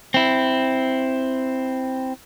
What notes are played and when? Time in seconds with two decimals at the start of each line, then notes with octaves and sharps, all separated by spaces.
0.14 C4 E4